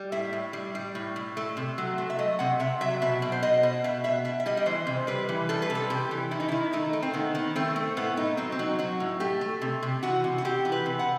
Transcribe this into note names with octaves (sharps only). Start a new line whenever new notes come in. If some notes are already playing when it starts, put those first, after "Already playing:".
Already playing: G3
A2 E5
A2
G3
G3
A2
A2
A3
C3
F#3
A3
E5
A3 D#5
C3 F#5
C3 E5
F#3 E5
B2 E5
B2
C5
B2 D#5
B2
B2 E5
B2 E5
B2 E5
E5
G3 D#5
D#5
E3 C5
C3
G3 B4
E3
G3 A4
B4
C3
A4
C3 G4
E3
D#3 E4
D#4
D#3 E4
A3 D#4
A3
C4
D#3 B3
D#3
A3 C4
A3
A2 B3
A3 D#4
F#3 C4
C4
F#3 D#4
F#3 F#4
A2
A3 G4
A3
C3
C3
E3 F#4
C3
F#4
C3 G4
E3
B4
C3
F#5